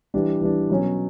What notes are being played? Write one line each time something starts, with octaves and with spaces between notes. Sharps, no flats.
E3 G3 D4
E3 G3 D4
B2 F#3 C#4